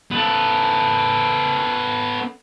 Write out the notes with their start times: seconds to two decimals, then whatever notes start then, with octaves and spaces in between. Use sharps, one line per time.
0.11 B3 A4